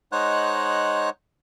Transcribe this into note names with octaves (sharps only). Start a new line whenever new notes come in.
G#3 D#4 C5 C#5 F#5 F#6